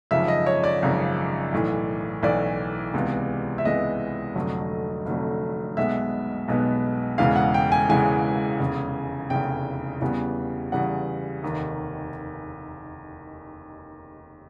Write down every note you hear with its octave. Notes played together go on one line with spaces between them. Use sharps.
G#1 F#2 C#3 F3 E5
D#5
C#5
D5
G#1 F#2 C#3 F3
B1 A2 E3
B1 A2 E3 D5
C#2 C3 E3 G#3 B3
E5
C#2 C3 E3 G#3 B3 D#5
F1 F2 D3 F#3 A3
F1 F2 D3 F#3 A3
B1 B2 G#3 B3 E5
B1 B2 G#3 B3
E1 E2 C#3 E3 G#3 F5
F#5
G5
G#5
E1 E2 C#3 E3 G#3 G#5
F1 E2 C#3
F1 E2 C#3 G5
E2 C#3 E3 G3 B3
E2 C#3 E3 G3 B3 F#5
F1 D#2 D#3